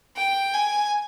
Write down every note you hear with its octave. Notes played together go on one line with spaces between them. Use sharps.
G5
G#5